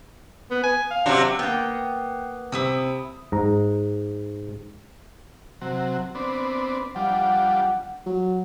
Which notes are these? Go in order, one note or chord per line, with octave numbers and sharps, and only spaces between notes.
B3
G#5
F5
C3 F#3 D4
A#3 B3 G5
C3 E4 D#6 E6
G#2 A#5
C3 F#3
B3 C4 D4
F3 G3 D4 F#5
F#3